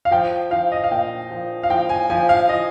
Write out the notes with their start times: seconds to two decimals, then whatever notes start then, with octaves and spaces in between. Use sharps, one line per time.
0.05 F5
0.11 F3 G5
0.51 F3 F5
0.72 D#5
0.84 F5
0.91 A#2 G5
1.31 F3
1.63 F5
1.69 F3 G5
1.89 G#5
2.10 F3 G#5
2.29 F5
2.49 F3 D#5